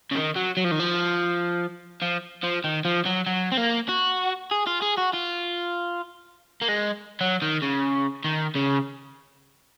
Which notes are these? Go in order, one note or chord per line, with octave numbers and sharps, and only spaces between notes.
C#3
D#3
F#3
F#3
F3
D#3
F3
F3
F3
D#3
F3
F#3
F#3
C4
A#3
F#4
G#4
F4
G#4
F#4
F4
A#3
G#3
F#3
D#3
C#3
D#3
C#3